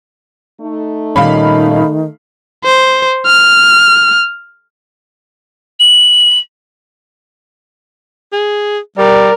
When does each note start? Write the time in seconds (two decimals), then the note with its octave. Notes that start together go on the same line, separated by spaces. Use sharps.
0.61 A3 D#4
1.16 A#2 D#3 G3 C#4 F5 B5
2.64 C5
3.26 F6
5.79 F#7
8.33 G#4
8.98 G3 A#4 D5